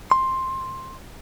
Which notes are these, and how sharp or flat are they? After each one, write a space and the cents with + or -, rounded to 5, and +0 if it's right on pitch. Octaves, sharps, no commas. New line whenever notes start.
C6 +10